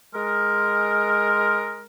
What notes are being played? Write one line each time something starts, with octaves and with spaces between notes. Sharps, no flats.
G#3 A#4